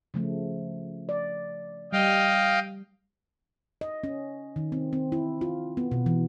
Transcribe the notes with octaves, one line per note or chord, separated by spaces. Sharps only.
C#3 F3 A3
D5
G3 D#5 F5 G5
D#5
C#4
D#3
C4
C4
E4
F4
B3
B2
E3